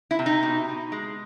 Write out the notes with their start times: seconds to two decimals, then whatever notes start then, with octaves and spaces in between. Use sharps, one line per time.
0.11 E4
0.19 C3
0.26 D#4
0.43 B2
0.68 B2
0.92 G#3